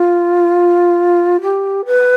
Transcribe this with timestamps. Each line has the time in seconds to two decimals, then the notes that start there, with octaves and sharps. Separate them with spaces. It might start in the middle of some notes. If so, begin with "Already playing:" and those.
Already playing: F4
1.42 G4
1.86 B4